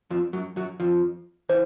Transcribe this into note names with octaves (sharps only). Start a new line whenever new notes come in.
F2 F3
F#2 F#3
F#2 F#3
F2 F3
E3 C5